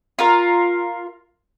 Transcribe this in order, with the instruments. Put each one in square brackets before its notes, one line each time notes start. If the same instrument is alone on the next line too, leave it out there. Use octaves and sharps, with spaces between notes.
[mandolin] F4 A#4